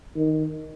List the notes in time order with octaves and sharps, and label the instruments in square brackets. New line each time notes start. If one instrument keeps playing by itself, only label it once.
[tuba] D#3